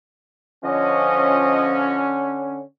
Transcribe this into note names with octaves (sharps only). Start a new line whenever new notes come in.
D3 F3 C#4 D#5